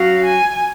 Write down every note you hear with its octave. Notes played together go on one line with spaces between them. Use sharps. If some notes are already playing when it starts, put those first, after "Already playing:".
Already playing: F#3 C#4 F#4 F5
G#5